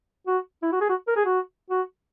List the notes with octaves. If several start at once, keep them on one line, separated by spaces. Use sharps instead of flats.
F#4
E4
F#4
G#4
F#4
A#4
G#4
F#4
F#4